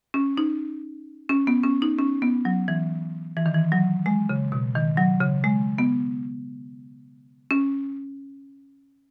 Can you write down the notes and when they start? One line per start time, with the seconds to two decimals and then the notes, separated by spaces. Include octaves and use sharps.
0.14 C#4
0.37 D#4
1.29 C#4
1.47 B3
1.64 C#4
1.82 D#4
1.98 C#4
2.22 B3
2.45 F#3
2.68 E3
3.37 E3
3.46 D#3
3.54 E3
3.72 F#3
4.06 G#3
4.29 C#3
4.52 B2
4.75 D#3
4.97 F#3
5.21 C#3
5.44 G#3
5.78 B3
7.51 C#4